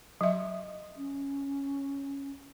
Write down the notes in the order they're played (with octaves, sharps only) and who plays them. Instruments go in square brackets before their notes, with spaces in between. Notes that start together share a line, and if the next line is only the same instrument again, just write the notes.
[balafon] F#3 E5
[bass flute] C#4